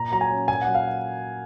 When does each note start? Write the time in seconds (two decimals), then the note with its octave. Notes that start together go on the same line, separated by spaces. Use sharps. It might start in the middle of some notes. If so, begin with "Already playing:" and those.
Already playing: A#2 A#5
0.12 F#3 A#5
0.21 G#5
0.30 C#4
0.48 A#2 G#5
0.61 F#5
0.67 F#3
0.75 F5